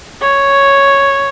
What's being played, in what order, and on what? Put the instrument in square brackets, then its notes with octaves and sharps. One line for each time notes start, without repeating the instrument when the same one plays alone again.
[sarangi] C#5